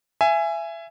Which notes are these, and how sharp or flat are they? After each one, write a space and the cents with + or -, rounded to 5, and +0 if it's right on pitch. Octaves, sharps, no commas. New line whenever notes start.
E5 +25 G#5 +0